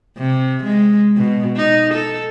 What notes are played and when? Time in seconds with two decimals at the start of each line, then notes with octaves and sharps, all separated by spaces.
0.18 C3
0.64 G#3
1.17 B2
1.56 D#4
1.94 A4